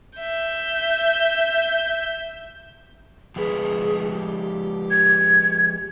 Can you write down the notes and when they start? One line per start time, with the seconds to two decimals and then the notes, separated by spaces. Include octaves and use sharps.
0.19 E5 G6
3.36 F3 G#3 G#4 B4
4.10 G4
4.91 G#6